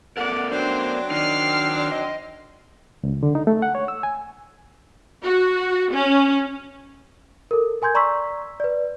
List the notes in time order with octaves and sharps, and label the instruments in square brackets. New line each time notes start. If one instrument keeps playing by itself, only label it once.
[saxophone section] F2 D5 F#5 [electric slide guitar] B3 A4 A#4
[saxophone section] F#3 C4 D4 [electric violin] C5
[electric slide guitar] D#3 D#4 [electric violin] F6 C7
[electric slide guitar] D#5
[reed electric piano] C#2
D3
D#4
A3
F#5
C#5
E6
G#5
[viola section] F#4
C#4
[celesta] A4 A#4
A#4 G#5 C6 G6 G#6
D5 A#5 C6 C#6 E6 B6
B4 D5